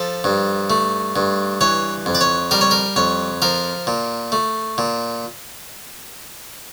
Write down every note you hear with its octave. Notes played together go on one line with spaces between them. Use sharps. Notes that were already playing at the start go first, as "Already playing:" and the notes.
Already playing: F3 A4
G2
A3
G2
E3 C#5
F2
D5
C#5
G3 A#4
C#5
A#4
F2 C#5
F3 A#4
A#2
A3
A#2